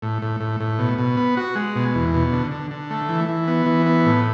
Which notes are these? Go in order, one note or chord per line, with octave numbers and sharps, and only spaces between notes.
A2
A2
A2
A2
B2
B2
B3
F#4
G#3
B2
E2
B2
D3
D3
D3
A3
E3
E3
B3
E3
B3
A2